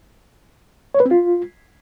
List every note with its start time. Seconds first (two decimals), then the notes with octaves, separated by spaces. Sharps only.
0.94 C#5
1.00 B4
1.06 C4
1.11 F4